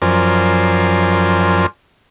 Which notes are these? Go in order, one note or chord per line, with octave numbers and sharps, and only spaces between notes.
F#2 F3 A#4 C5 D5 G#5